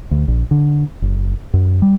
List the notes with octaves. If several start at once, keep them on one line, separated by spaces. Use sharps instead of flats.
D2
A#1
D3
F#1
F#2
G3